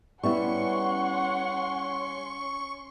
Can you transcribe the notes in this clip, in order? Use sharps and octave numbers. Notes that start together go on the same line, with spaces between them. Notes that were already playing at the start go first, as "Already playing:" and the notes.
G3 B3 C#4 E4 F#5 C6 C#6